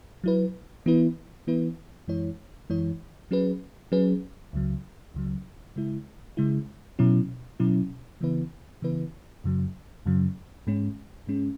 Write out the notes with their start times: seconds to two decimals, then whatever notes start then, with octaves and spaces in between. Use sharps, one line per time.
0.24 F#3 E4 B4
0.86 E3 B3 E4 B4
1.47 E3 B3 E4 B4
2.08 F#2 E3 G#3 E4 C#5
2.70 F#2 E3 G#3 E4 C#5
3.31 F#3 C#4 G#4 B4
3.92 F#3 C#4 G#4 B4
4.53 C#2 C#3 F#3
5.14 C#2 C#3 F#3
5.76 C#3 G#3 E4
6.37 C#3 G#3 E4
6.99 B2 F#3 C#4 E4
7.60 B2 F#3 C#4 E4
8.21 C#3 E3 B3 E4 B4
8.82 C#3 E3 B3 E4 B4
9.44 F#2 C#3 F#3
10.06 F#2 C#3 F#3
10.67 G#2 G#3 C#4
11.27 G#2 G#3 C#4